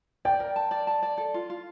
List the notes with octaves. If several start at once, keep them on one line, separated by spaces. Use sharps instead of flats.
D5 G5
A#4
A5
D5
A5
D5
A4
F4
F4